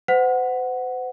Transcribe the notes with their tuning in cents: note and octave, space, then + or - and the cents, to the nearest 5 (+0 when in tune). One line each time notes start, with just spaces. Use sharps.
C5 -40 F#5 +0